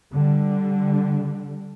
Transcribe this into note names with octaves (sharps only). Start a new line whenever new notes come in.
D3 G3